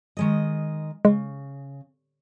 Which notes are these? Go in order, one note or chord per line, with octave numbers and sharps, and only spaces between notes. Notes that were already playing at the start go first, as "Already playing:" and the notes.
D#3 G#3 D#5
C#3 G#3